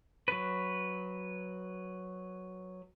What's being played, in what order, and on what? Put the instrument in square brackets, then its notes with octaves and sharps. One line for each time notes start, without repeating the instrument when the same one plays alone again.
[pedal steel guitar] F#3 B4